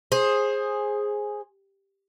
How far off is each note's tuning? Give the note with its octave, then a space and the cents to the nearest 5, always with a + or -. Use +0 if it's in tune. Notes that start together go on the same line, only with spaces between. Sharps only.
G#4 +0 C5 +20